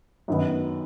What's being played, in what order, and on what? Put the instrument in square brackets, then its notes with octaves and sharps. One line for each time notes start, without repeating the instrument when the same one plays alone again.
[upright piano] F#2 D#3 B3